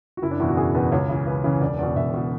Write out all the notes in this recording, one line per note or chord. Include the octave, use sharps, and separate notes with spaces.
F#4
F#1 E4
D4
E2 B2 E4
F#4
F#1 G#4
E2 B2 B4
C#2 C#5
C#3 E3
C#2 B4
C#3 E3
E1 D5
E2 B2 D5
E1 E5
B2